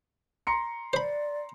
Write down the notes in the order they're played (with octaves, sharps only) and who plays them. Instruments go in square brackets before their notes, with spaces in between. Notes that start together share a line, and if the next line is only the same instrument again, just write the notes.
[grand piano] A#5 C6 C#7
[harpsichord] C5 B5 [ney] D5